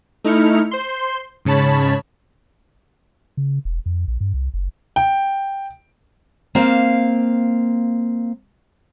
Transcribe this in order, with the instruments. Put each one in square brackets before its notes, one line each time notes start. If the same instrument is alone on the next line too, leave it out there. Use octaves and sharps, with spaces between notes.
[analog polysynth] A3 D#4 E4 F6 C#7
C5 C6
G#2 C#3 C#5 A5 B5
[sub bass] C#3
E1
F2
A#1
G2
C2
F#1
[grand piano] G5
[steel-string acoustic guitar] A#3 C4 F5